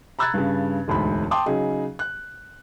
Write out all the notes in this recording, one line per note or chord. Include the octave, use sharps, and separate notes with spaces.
A#5 B5 E6 F#6 G#6 A6
G2 C#3
E1 D2 G#2 B5
G5 A5 C6 D6 D#6
C#3 F#3 D#4 G#4
F#6